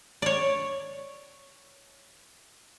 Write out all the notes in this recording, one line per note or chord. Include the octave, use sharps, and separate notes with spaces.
C#5 D5